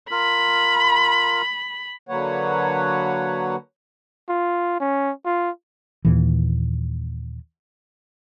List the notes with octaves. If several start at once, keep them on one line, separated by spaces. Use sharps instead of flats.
F4 A#4 B5
D3 F#3 A#3 B4 C#5 F#5
F4
C#4
F4
D#2 A#2 E3